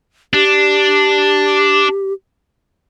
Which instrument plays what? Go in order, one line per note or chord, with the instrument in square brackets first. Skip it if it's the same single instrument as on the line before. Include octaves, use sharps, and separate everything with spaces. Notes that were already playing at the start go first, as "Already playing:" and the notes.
[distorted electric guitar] D4 [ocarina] G4